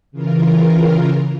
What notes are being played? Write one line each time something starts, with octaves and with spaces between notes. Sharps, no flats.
C#3 E3 F4 A#4